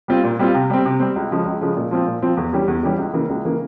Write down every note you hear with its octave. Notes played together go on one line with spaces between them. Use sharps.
G3 C4 F4
A#2
G3 C4 F4
C3
G3 C4
C3
G3 C4
C#2
C#3 F3 G#3
C#2
C#3 F3 G#3
A#2
F3 C4 F4
A#2
F3 C4 F4
E2
E3 G3 C#4 G4
E2
E3 G3 C#4 G4
C#2
C#3 E3 A#3
C#2
C#3 E3 A#3